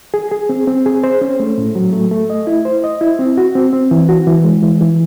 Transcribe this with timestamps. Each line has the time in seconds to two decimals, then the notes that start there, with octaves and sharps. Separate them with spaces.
0.14 G#4
0.31 G#4
0.49 C4
0.67 C4
0.86 G#4
1.04 C5
1.21 C#4
1.40 A3
1.58 A2
1.75 F#3
1.93 A3
2.11 A3
2.30 D#5
2.47 E4
2.65 C5
2.84 D#5
3.01 E4
3.19 C4
3.37 F#4
3.55 C4
3.73 C4
3.91 E3
4.09 F#4
4.27 E3
4.44 G#3
4.63 E3
4.81 E3